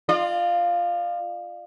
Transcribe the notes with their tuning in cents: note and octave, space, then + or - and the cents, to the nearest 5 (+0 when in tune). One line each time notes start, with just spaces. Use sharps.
F4 +0 D5 +45